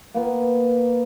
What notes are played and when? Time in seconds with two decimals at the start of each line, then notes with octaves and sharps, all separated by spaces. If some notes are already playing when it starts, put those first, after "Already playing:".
0.15 A#3 B3